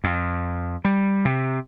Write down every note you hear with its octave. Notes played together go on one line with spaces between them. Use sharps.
F2
G3
C3